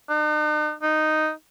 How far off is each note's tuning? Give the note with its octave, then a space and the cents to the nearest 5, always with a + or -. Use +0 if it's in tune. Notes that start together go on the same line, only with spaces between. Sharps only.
D#4 -45
D#4 -5